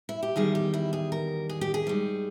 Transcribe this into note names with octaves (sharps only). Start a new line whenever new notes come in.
E4
G4
E2 D#3 G3 G#4
G4
E4
G#4
A#4
G#4
G4
G#4
G#2 G3